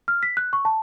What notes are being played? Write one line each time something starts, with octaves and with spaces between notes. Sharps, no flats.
F6
B6
F#6
C#6
A5